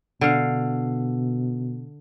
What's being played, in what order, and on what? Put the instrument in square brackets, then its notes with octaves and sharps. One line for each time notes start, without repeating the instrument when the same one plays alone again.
[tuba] B2 [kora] D3 F5